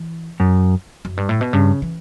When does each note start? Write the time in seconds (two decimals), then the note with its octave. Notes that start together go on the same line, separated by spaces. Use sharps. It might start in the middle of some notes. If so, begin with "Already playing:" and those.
Already playing: E3
0.40 F#2
1.05 F#2
1.17 G2
1.29 A2
1.41 B2
1.53 G2 C#3
1.82 E3